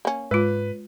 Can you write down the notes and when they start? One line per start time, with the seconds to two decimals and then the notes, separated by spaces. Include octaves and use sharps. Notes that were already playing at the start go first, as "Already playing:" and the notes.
0.05 A#3 C#4
0.31 G#2 G#3 F4 B4